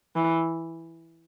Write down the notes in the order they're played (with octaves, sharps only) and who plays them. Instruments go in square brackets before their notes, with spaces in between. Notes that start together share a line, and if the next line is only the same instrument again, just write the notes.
[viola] E3